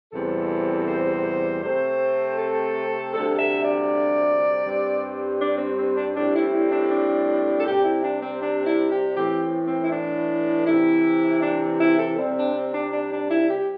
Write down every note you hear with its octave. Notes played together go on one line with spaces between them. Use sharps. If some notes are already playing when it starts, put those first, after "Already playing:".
E2 C3 G3 C4 A4
C5
C3 A3 C4 C5
A4
D2 C3 G3 A4
E5
D5
G2 G3 C4
D4
C4
C4
D4
A2 G3 C4 D4
E4
E4
D4
D4
A4
C3 G3 C4 G4
E4
D4
C4
D4
E4
G4
A2 E3 C4 G4
C4
E4
D4
C3 E3 C4 E4
D4
E4
A4
C3 G3 C4
D4
C4
D4
D4
D4
E4
G4